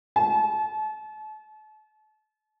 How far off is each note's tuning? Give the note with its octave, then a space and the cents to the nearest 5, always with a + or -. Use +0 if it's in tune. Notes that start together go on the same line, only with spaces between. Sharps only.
A5 -35